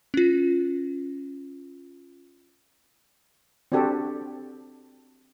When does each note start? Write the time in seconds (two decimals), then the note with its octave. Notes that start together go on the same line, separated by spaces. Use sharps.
0.14 C#4 F4
3.72 C4 D4 F#4 G4 A4